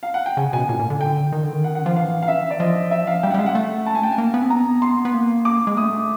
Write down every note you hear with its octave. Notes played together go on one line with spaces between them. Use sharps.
F5
F#5
G5
C#3 G#5
B2 G#5
A#2 G#5
A#2
D3
G5
D#3
D3
D#3
F#5
F#5
F3 F5
E3 F5
F5
E5
D5
F3 D#5
E5
F5
G3 G5
F#5
G3
G#3 F5
F#5
A3
A5
G#5
G5
G#5
A#3
B3
C4
B3 A#5
C6
B3
A#3
D6
G#3
A3 D#6